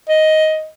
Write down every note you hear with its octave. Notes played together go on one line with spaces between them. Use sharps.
D#5